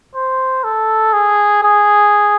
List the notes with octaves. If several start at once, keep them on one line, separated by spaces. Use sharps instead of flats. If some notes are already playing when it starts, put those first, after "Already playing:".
C5
A4
G#4
G#4